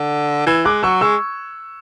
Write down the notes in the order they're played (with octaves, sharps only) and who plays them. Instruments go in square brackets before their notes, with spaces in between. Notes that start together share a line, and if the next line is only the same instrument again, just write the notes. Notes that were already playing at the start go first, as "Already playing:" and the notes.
Already playing: [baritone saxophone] D3
[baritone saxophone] E3 [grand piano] E6 G#6
[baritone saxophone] G#3 [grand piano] D6 F#6
[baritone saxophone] F#3 [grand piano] C#6 E6
[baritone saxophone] G#3 [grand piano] C#6 E6